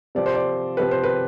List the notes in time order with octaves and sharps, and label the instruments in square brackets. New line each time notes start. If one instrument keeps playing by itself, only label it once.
[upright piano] C3 F3 C4 G4 [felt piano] D5
[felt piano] C5
D5
[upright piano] C3 F3 C4 G4 [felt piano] B4
[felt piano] C5
B4